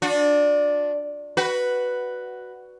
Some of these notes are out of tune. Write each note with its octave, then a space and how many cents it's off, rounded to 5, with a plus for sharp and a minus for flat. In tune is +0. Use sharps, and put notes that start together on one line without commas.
D4 +0 F#4 -45
F#4 +5 B4 +0